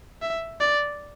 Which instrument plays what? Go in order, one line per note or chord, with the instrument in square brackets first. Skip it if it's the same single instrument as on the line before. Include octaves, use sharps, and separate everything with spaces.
[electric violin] E5
D5